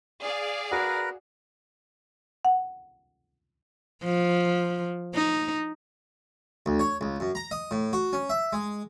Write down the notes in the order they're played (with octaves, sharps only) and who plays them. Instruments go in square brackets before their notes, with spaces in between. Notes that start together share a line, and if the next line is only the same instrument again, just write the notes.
[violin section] G#4 D5 F5
[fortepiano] F#4 [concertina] A#4 B4 A#5
[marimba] F#5
[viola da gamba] F3
D#4
[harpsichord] D2
C#5
C#2
F#2
A#5
D#5
A2
F#4
C#4
E5
G#3